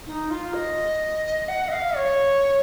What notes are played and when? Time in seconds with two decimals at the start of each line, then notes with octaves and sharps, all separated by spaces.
0.07 D#4
0.30 F4
0.54 D#5
1.48 F#5
1.68 D#5
1.72 F5
1.96 C#5